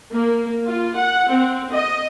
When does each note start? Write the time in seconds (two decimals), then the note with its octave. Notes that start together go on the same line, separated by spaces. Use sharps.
0.12 A#3
0.67 F4
0.95 F#5
1.30 C4
1.72 D#5